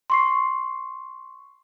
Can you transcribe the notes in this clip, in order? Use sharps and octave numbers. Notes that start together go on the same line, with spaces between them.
C6 C#6 C7